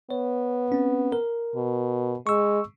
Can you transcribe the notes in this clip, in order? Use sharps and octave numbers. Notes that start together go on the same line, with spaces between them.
B3 C#5
C4 C#4
A#4
B2
G#3 C#6 E6